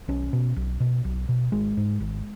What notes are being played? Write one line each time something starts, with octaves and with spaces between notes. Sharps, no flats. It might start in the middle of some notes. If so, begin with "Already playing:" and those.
B1 C#4
B2
B1
B2
B1
B2
G#1 G#3
G#2
G#1